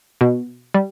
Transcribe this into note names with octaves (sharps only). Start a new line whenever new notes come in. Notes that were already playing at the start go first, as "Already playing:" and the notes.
B2
G3